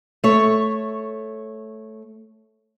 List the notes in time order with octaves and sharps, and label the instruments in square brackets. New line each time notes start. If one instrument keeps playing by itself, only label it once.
[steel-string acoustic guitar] A3 C#5